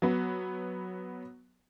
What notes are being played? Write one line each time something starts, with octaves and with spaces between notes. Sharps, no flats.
F#3 B3